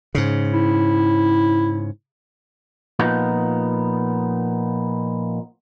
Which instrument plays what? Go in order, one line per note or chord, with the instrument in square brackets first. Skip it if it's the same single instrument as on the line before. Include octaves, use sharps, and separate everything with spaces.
[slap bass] G#2 C#3
[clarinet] E4
[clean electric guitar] A#2 F3 B3 D#4